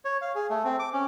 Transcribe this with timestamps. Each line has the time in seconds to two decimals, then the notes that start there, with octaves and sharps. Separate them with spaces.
0.05 C#5
0.22 F5
0.35 G#4
0.50 A3
0.64 C4
0.79 D6
0.93 C#4